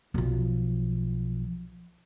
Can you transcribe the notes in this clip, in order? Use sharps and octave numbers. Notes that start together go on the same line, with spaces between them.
B1 F3